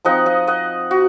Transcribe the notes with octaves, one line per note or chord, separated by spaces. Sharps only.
F3 C4 D#4 D#5 F#5
D#5 F#5
D#5 F#5
F#4